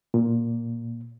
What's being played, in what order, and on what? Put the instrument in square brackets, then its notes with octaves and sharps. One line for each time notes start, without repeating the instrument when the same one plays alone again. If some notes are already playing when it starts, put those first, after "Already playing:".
[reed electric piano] A#2